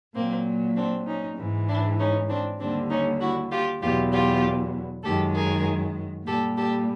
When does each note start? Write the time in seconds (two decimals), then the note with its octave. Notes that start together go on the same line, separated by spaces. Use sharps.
0.15 A#2 F#3 A#3 C4
0.76 C4 D4
1.07 C#4 D#4
1.37 G#2 E3 G#3
1.68 D4 E4
1.99 C#4 D#4
2.28 C4 D4
2.60 D#2 D3 G3 C4 D4
2.90 C#4 D#4
3.20 E4 F#4
3.51 F4 G4
3.82 E2 B2 F#3 F4 G4
4.13 F4 G4
5.04 F#2 D#3 G#3 G4 A4
5.35 G#4 A#4
6.26 A#2 G3 G4 A4
6.57 G4 A4